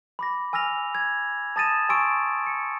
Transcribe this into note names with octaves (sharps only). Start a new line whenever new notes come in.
B5 D6 A#6
G#5 E6 F6 A#6 F7
G#6
A5 D#6 A6 A#6 D#7 E7
G#5 C6 C#6 E6 D7
C#7